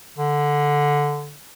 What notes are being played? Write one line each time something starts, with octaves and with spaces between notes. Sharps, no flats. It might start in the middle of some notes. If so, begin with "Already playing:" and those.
D3